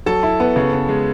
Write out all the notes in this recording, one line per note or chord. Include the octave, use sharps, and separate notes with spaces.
F#3 A4 A5
E4
B3
C#3
B3
G#3